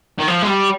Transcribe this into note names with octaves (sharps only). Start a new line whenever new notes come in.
D#3
F3
G#3
G3